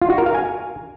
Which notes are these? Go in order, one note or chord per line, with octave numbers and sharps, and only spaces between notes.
F4
F#4
A#4
F5
G#5